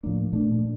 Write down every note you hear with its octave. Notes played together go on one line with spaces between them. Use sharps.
A2 F3 A#3 D4
A#2 A3 D4